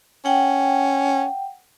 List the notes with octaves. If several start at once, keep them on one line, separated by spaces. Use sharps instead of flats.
C#4 F#5 G5